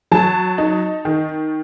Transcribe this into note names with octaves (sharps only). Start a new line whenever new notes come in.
F#3 A5
D#4
D#3